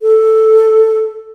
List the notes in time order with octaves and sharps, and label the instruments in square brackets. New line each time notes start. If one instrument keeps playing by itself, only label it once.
[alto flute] A4